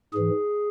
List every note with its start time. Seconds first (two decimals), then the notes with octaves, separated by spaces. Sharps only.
0.13 G#2 E3 G#4